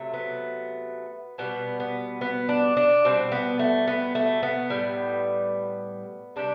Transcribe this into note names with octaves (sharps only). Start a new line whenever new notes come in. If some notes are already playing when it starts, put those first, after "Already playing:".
Already playing: C3 F#3 A3
B3
B2 G3 B3
B3
B3
D4
D4
B2 G3 C4
B3
A3
B3
A3
B3
A2 G3
C3 G3 D4